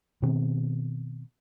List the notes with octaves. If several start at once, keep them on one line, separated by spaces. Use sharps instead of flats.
B2 D#3 B3 C4